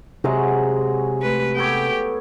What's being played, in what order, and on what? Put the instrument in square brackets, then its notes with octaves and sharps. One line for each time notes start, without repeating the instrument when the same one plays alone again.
[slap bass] C3 [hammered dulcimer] F#3 G#3 F#4
[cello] A3 B4
[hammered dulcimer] B3 A4 C#5 [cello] G4 G5